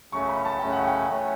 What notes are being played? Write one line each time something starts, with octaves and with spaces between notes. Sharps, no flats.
F#2 C#3 F#3 A3 C#4 C#6
B5
A5
F#2 C#3 F#3 A3 C#4 G5
F#5
G5
F#3 A3 C#4